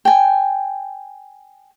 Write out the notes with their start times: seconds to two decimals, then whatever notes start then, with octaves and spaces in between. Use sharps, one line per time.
0.05 G5 G#5